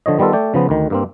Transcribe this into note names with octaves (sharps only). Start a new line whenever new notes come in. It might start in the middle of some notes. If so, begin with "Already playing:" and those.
D3 F3 C#5 D#5
D#3 G3 B3 F4 A4
A3 D5 G5
C#3 F3 B3
D2 D#3
G2 A#3 C4